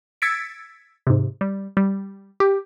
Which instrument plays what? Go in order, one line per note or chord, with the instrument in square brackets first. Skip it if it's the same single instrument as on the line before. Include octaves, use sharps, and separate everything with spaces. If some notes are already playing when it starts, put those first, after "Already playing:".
[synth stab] E6 G#6 A6 B6 C#7 D7
G#2 C3
G3
G3
G4